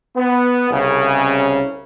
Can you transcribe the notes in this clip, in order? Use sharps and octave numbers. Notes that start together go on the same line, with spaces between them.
B3
C2 C#3